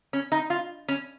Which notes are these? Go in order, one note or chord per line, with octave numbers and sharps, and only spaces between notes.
C#4
D#4
F4
C#4